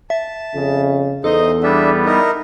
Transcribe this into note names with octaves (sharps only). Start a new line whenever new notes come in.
E5 A5
F2 C#3
E2 D#4 A4 C5 D#5
G3 B3 D4 E5
D#4 E4 A#4